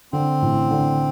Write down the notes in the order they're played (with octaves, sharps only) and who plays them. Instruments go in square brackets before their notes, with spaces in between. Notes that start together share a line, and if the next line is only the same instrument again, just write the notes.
[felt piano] D3 [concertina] C4
[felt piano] A1
D3